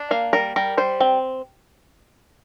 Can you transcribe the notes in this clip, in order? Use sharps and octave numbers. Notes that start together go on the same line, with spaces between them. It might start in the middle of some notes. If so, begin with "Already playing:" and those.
Already playing: D4
A#3 F5
G3 A#4
G3 A#4
G3 C5
C4